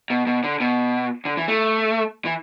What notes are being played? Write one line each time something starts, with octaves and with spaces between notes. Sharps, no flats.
B2
B2
D3
B2
D3
E3
A3
E3